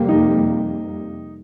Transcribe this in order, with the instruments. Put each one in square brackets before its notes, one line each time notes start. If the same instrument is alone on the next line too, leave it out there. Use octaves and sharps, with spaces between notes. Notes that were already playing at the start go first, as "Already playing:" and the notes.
Already playing: [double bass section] F2 C3 G3 A#3
[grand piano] D#4